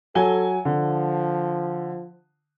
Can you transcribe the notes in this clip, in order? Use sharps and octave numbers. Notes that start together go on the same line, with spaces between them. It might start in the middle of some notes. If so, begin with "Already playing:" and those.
F#3 A4 G#5 G7
D3 F3